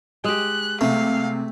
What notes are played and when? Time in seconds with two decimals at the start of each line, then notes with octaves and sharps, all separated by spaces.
0.24 G#3 G4 F#6
0.81 C3 A3 F5